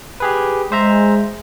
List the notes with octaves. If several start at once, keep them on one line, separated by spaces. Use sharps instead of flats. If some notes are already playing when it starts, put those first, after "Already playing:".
G4 G#4 B4
G#3 C5 E5 A#5